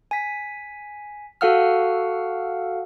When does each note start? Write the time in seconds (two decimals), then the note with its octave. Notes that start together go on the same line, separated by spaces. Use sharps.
0.11 G#5 B6
1.41 F#4 A4 F5 F#5 E6 F6